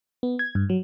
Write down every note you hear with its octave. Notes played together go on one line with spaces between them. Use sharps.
B3
G#6
G2
F#3